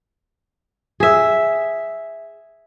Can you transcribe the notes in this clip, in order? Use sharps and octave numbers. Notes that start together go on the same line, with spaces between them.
G#4 E5